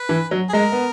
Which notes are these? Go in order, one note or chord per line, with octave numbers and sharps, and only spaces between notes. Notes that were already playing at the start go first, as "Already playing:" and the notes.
Already playing: B4
E3
F#3
G#4
G#3 A#4
B3